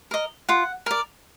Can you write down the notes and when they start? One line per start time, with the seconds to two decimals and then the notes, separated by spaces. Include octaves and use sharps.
0.11 A#4 D#5
0.49 F4 F#5
0.86 A#4 D5